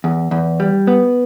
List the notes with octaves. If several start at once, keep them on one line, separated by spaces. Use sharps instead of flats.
E2
E2
G3
B3